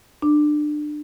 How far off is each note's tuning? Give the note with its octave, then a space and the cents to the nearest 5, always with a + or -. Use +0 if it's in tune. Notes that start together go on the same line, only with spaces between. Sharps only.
D4 +25